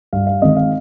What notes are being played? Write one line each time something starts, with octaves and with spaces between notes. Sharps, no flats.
G2 F5
F5
D#3 G#3 C4 D#5
F5